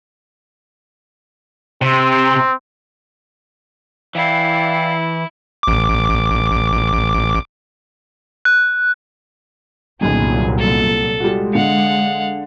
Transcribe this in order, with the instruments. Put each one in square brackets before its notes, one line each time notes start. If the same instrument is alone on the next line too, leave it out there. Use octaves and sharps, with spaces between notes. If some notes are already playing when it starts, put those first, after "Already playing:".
[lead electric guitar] C3 [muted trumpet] C4
[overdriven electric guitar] E3 [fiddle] E4 [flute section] D5 F5 G5
[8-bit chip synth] A1 D6
[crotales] F#6
[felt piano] G1 F#2 D#3 [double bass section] C2 A#2 F#3 [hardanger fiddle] G#4
[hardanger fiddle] A4
[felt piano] G3 F4 F#4 [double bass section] G#3
[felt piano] D3 C#7 [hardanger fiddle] F5 F#5